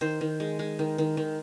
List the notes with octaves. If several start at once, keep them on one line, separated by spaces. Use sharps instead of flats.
D#3 C5
D#3
G#3
G#3
D#3
D#3
D#3